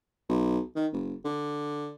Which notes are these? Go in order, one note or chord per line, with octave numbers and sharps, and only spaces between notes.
B1
D#3
F#1
D3